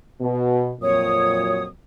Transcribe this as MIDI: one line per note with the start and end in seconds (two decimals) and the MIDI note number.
0.21 0.71 47
0.81 1.67 41
0.81 1.67 46
0.81 1.67 54
0.81 1.63 73
0.81 1.63 87